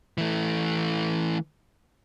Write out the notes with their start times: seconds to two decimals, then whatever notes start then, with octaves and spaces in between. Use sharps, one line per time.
0.18 E3 A3